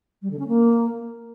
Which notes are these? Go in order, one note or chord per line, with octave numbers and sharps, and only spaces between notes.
G3
D3
C#4
A#3